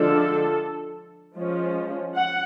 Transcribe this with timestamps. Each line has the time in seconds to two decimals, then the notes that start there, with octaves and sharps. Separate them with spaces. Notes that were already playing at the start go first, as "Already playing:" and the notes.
Already playing: D3 F3 G#3 D4 A4
1.36 F3 G#3 C#4
2.15 F#5